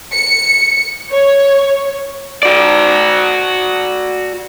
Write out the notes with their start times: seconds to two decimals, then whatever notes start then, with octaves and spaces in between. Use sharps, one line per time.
0.13 C#7
1.11 C#5
2.43 F#4 D5